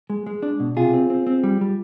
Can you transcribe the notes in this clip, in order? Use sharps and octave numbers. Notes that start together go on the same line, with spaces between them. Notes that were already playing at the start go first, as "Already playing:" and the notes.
G#3
G#3
D4
B2
C3 F4 G#4
C4
C4
C4
G3
G3